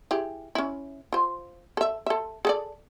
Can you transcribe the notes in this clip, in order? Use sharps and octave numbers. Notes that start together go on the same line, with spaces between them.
E4 G4 G#4
C#4 E4
F4 C5
A4 E5
A4 E5
G#4 A4 D5